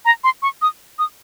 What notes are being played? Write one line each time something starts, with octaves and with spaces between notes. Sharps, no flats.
A#5
C6
C#6
D#6
D#6